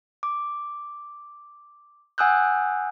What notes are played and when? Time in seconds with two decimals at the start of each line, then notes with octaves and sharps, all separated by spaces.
0.23 D6
2.18 F#5 G#5 D#6 E6 F#6 G6